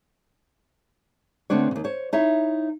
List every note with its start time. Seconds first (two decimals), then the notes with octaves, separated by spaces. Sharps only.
1.50 D3 A3 B3 C4 D4 C#5
1.71 D#2 C#3
1.84 C5 C#5
2.13 D#4 E4 C#5 E5